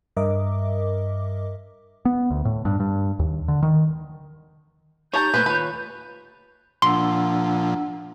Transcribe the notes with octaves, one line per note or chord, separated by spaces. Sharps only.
G2 A#4 D#5 E5 D6
B3
D2
A2
G2
G2
D#2
D3
D#3
D#4 G4 C#5 A5 A#5 G6
A#2 A3 B4 C5
D#2 F4 B4 C#5
A#2 F3 D4 F#5 C6 E6